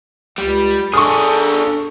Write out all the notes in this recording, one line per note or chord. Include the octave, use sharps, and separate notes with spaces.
C#2 G3
D4 G#4 A4 C#6 D#6